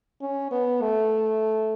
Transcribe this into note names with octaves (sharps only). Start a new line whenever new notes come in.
C#4
B3
A3